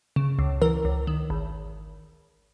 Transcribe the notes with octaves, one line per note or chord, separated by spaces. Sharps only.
C#3
C#2
E3 A#4
C#2
D#3
G#1